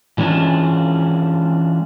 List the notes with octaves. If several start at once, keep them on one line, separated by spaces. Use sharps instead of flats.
E3 G#3 A3 C#4 D4 F4